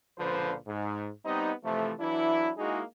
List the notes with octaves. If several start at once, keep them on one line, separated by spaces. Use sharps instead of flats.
C#2 A#2 D3 F3 B4 C5
G#2
G3 B3 C4 D#4
C3 E3 F3 A3
E3 F#3 D4 E4
G#3 A#3 D#4 E4 F#4 G#4